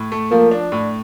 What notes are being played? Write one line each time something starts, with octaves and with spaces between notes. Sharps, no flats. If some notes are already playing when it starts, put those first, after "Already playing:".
Already playing: A2
A3
F3 A#3
D4
A2